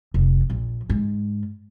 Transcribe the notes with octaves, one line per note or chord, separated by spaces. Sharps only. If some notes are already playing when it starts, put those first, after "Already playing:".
F1
A#1
G#2